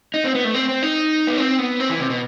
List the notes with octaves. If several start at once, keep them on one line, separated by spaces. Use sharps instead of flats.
D#4
C4
B3
A3
C4
C4
D#4
B3
C4
B3
C4
E3
C3
B2